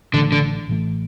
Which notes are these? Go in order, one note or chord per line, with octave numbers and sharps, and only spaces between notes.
A1 A2 D3 E3 A3
D3
A1 A2 E3 A3